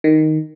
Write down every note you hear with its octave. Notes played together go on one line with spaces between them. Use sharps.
D#3